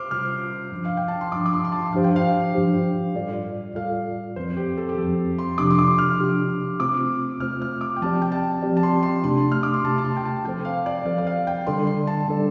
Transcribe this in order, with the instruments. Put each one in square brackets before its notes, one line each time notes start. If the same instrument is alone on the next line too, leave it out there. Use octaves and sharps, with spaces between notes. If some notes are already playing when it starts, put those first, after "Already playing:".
Already playing: [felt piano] C5 C6 D6 F6
[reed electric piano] C3 G3 F4 [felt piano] F6
[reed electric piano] G2 F3 D4
[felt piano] F5
G5
A5
C6
[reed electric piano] G2 F3 D4 [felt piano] D6
[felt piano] D6
C6
C6
A5
[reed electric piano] G2 F3 D4 G4 C5 [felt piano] F5
[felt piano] G5
F5
[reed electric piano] G2 F3 D4 G4 C5
A2 G3 F4 A4 D5
[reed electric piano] A2 G3 F4 A4 D5 [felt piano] F5
[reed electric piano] F2 F3 C4 [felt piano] C5
[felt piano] G4
A4
G4
[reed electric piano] F2 F3 C4 [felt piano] A4
[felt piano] C6
[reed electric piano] C3 F3 D4 G4 [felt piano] D6
[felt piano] C6
D6
F6
[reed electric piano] C3 F3 D4 G4
[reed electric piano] C3 A3 C4 F4 C5 [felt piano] D6
[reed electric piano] C3 A3 C4 F4 C5 [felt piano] F6
[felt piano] F6
D6
G5
[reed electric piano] F3 C4 G4 D5 [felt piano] A5
[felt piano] G5
A5
[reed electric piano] F3 C4 G4 D5
[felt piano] A5
C6
C6
[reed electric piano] C3 A3 D4 G4 [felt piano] C6
[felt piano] F6
D6
C6
[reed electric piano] C3 A3 D4 G4 [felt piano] A5
[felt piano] A5
C6
G5
A5
[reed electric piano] F3 C4 A4 C5 [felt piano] G5
[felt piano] F5
D5
[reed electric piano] F3 C4 A4 C5 [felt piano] F5
[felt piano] D5
F5
G5
[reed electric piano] D3 G3 D4 A4 D5 [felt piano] C6
[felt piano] C6
A5
[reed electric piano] D3 G3 D4 A4 D5